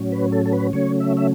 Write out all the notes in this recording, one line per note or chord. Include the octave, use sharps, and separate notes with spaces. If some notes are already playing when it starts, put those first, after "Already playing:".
Already playing: A2 F#3 C#4
B4
A4
A4
B4
C#3 F#3 A3 C#4 C#5
E5
E5